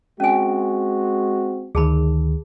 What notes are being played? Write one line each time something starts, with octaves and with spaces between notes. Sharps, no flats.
G#3 C4 C#4 F#4 G#5
D2 D#3 G#4 A5 B5